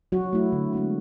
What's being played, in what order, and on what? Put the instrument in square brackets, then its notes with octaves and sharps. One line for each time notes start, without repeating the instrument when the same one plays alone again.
[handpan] F#3 F#4
A3 E4
D3
G#3 B3 E4